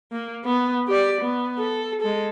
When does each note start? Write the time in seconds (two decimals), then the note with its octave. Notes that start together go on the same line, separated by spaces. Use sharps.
0.12 A#3
0.44 B3
0.88 G4 D5
1.21 B3
1.59 A4
2.01 G#3 A4